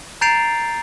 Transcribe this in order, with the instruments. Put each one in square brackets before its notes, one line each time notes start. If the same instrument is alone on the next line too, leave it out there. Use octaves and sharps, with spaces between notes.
[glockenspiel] A#5 G6 A6 C7 D7 F7